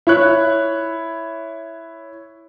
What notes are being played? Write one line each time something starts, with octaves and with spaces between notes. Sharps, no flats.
E4 C#5 F#6